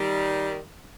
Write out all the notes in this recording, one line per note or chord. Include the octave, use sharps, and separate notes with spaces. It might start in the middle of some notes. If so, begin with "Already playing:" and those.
Already playing: D#3 G3